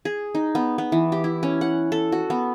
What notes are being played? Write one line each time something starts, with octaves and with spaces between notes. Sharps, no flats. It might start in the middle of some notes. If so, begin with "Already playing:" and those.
G#4
D#4
B3
B3
E3
G4
E4
C#4
F#5
A4
F#4
B3